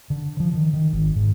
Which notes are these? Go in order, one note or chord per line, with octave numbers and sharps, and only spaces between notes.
D3
F3
D#3
D#3
G#1
G#2